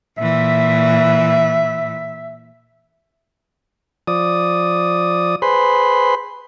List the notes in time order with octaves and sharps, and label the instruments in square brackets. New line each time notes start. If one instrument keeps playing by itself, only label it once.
[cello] A#2 E3 [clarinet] E5
[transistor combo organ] F3 D5 D#6
G#4 B4 C5 B5 C6